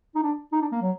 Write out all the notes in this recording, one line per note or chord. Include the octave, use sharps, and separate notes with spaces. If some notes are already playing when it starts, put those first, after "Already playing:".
D#4
D4
D#4
D4
A#3
F#3